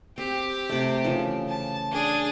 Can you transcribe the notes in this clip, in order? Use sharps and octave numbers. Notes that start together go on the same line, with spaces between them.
C4 G4
C3 A3
C#3 E3 F3
A5
D4 G#4